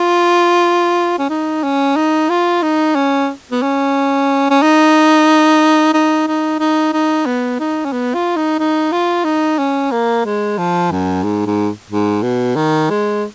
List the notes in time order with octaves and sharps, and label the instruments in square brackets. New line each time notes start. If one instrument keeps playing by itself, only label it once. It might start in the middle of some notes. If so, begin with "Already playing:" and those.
Already playing: [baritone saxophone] F4
C#4
D#4
C#4
D#4
F4
D#4
C#4
B3
C#4
C#4
D#4
D#4
D#4
D#4
D#4
B3
D#4
C#4
B3
F4
D#4
D#4
F4
D#4
C#4
A#3
G#3
F3
F#2
G#2
G#2
G#2
B2
D#3
G#3